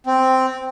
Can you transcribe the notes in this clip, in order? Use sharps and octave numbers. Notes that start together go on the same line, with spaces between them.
C4